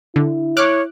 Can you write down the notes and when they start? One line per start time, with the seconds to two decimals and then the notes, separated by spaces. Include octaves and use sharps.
0.16 D3 E4
0.57 C#5 D6 F6 F#6